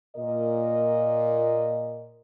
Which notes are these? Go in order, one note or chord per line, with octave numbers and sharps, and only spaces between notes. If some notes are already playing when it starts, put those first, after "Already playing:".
A#2 A#4 D#5